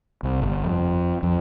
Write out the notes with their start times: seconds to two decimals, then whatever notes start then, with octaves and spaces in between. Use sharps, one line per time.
0.23 C2
0.42 G1
0.64 F2
1.23 F2